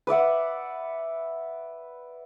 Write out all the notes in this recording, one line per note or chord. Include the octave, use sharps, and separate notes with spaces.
B4 D5 E5 F#5